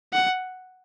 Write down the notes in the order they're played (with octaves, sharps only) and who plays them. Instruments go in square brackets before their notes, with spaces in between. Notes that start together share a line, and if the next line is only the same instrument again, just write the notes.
[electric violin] F#5